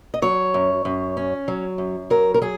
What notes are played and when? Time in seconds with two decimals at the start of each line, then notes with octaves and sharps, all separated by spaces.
0.14 D#5
0.22 F#3 C#5
0.54 F#2
0.85 F#2
1.17 C#4
1.48 F#3
1.78 F#2
2.10 F#3 A#4
2.34 A#4
2.42 F#3 G#4